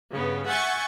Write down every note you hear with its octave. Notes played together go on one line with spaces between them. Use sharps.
G2 C#3 B3
E5 F#5 G#5 C#6 G6 A6